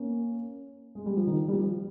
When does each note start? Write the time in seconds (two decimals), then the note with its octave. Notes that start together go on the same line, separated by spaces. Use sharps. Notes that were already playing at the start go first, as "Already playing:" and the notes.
Already playing: A#3 C#4
0.95 G#3
1.06 G3
1.17 F3
1.27 D#3
1.48 G3
1.52 F3